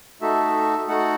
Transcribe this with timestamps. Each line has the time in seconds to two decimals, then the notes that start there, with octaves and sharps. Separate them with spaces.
0.21 A3 D#4 F#4 A4 E5
0.88 A3 D#4 F#4 A4 F#5